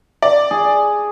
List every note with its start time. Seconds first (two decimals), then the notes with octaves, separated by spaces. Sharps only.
0.23 D5
0.51 G#4